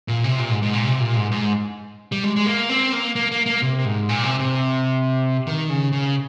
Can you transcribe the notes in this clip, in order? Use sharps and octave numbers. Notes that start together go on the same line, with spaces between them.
A#2
C3
A#2
G#2
G#2
A#2
C3
A#2
G#2
G#2
G3
G#3
G#3
A#3
C4
A#3
A#3
A#3
A#3
C3
G#2
A#2
C3
C3
D#3
C#3
C#3